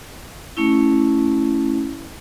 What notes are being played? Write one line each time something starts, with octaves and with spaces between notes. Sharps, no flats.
A3 C#4 E4